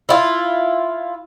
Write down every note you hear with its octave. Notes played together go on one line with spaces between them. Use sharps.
E4 F4